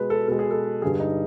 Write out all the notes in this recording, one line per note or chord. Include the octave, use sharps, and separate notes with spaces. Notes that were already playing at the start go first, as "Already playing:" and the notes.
Already playing: B2 G#3 B4
A4
B2 G#3 A4
G#4
A4
G2 D3 G3 G#4
D#4